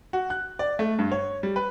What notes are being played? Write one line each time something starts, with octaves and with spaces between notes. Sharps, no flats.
F#4
F#6
D5
A3
G2
C#5
G3
B4